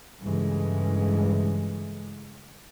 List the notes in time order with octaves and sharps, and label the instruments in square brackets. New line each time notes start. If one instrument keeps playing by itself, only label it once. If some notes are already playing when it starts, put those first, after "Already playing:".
[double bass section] G2 C#3 E3 G#3 A3